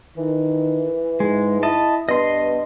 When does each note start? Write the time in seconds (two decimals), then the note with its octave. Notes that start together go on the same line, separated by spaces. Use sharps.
0.17 D#3 E3
1.20 G#2 G#3
1.63 E4 D#5 A5
2.09 G2 B3 D#5 C6